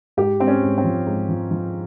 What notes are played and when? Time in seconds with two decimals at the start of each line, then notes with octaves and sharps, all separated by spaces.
0.17 G#2 G4
0.40 G#2 C4
0.47 C#4
0.63 G#2
0.78 C4
0.84 F3
1.06 G#2
1.29 F3
1.51 F3